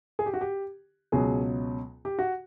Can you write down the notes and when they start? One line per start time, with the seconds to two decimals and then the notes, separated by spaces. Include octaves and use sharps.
0.19 G#4
0.26 G4
0.34 F#4
0.41 G4
1.12 C#2 B2 F#3 G#4
2.05 G4
2.19 F#4